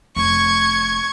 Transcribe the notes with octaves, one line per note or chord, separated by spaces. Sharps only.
F1 C#6 G#6